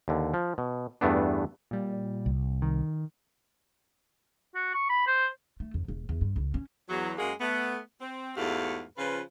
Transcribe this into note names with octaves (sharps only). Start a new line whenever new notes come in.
D#2 D3
F3
B2
E2 G2 A3 B3 D4
A#2 G3
C2
D#3
F#4
C#6
B5
C5
A3
F2
E1
E2
G2
C#2
C#4
E2 F#3
F#2 G#3 A#3 F#4 G#4
A3 B3
C4
E2 G#2 A3 F#4 G4 F5
C#3 F3 F4 B4